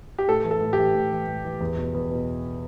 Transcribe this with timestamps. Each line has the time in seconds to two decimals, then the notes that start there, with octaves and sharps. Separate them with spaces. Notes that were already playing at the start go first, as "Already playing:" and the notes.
0.18 G4
0.28 A2 A4
0.44 E3
0.51 A4
0.61 A2
0.73 E3 G4
0.95 A2
1.11 E3
1.28 A2
1.45 E3
1.61 E2
1.78 B2
1.94 E2
2.11 B2